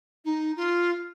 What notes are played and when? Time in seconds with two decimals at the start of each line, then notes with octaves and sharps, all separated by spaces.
0.25 D#4
0.56 F4